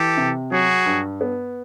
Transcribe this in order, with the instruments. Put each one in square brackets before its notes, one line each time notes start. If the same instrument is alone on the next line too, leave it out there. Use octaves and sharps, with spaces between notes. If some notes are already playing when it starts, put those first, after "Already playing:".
Already playing: [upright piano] E3 [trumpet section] G4 A4
[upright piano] C3
[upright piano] F#3 [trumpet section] F#4 G#4
[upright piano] G2
B3